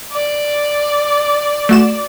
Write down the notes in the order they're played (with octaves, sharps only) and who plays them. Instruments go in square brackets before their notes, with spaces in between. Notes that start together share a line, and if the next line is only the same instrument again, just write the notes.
[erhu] D5
[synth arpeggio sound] A3 F#4 E7